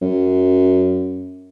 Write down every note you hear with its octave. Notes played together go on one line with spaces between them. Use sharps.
F#2